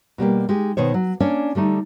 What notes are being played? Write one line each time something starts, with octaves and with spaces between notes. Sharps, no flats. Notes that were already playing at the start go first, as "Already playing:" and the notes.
B2 G3 A#3 G4
G#3 D#4 G4
B2 D#3 C5 C#5
F#3
A#3 C#4 D4 C#5 D5
D3 G3 A3 D#4